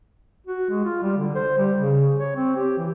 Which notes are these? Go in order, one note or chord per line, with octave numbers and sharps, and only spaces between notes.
F#4
G#3
F4
G3
D3
C5
G3
C#3
C#5
C4
G4
E3